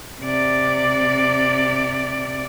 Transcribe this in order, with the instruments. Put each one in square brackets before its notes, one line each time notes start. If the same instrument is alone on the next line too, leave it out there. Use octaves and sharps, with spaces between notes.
[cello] C3 D5